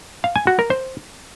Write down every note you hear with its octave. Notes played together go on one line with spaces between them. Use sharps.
F5
G#5
F#4
A#4
C5